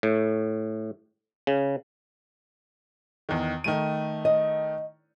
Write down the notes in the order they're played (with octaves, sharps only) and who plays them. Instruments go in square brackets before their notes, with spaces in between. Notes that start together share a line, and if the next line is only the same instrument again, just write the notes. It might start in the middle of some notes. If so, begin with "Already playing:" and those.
[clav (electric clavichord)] A2
C#3
[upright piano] E2 D#3
D#3 A3 D#7
[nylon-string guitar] D#5